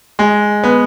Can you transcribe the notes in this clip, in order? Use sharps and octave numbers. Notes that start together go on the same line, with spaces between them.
G#3
B3